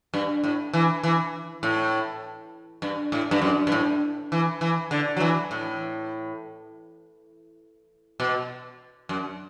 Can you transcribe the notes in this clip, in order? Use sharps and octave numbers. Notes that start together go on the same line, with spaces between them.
G2
A2
E3
E3
A2
G2
A2
G2
F#2
G2
A2
E3
E3
D3
F#3
E3
A2
B2
F#2